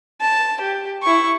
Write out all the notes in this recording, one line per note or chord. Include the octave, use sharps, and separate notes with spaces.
A5
G4
E4 C#6